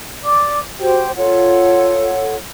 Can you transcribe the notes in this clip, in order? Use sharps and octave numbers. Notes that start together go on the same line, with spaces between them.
D5 D6
F#4 G4 C5 G5
F4 A4 C#5 F#5